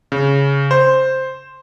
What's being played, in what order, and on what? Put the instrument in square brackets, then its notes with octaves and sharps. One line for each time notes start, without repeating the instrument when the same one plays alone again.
[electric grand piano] C#3
C5